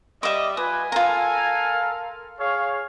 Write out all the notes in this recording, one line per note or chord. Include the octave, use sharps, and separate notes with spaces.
G3 D#5 E5 D6
F4 B4 G#5 D#6
F4 A4 A#4 F5 A#5
G#4 C#5 F5